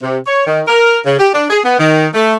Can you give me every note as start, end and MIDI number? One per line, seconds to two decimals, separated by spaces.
0.02 0.17 48
0.26 0.42 73
0.47 0.61 51
0.67 0.99 70
1.05 1.17 49
1.19 1.29 67
1.34 1.47 62
1.50 1.59 68
1.64 1.75 59
1.78 2.08 51
2.14 2.35 57